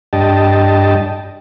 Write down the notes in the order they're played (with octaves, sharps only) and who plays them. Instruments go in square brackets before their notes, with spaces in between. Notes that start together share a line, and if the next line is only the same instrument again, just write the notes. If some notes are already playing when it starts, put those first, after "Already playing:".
[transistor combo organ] G2 D4 G4 D#5 A5